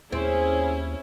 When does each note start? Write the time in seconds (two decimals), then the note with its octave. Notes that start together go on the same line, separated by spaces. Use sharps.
0.12 D#2 C4 C#4 E4 G#4